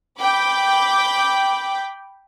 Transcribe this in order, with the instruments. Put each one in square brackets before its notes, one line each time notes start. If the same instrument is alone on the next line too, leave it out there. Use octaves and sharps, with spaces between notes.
[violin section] G5 B5 D6